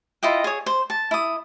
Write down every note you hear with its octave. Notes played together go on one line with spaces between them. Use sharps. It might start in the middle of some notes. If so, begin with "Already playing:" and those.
E4 F4 D#5 G5
G#4 C#5
C5
A5
E4 D#6